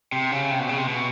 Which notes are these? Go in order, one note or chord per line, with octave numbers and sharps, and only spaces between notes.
C3
C#3
C3
B2
C#3
C3
B2